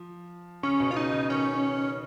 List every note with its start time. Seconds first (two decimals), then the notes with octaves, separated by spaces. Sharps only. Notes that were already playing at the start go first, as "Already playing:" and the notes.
Already playing: F3
0.63 C#3 C#4
0.80 B2
0.91 F4
0.97 C#3 D#4
1.12 C#3
1.30 D#3 C#4